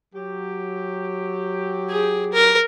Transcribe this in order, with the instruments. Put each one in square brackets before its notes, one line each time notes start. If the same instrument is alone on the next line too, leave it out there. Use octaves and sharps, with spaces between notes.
[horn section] F#3 G4
[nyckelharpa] G#4
A#4